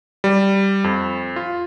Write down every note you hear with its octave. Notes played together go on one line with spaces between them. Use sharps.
G3
F2
F4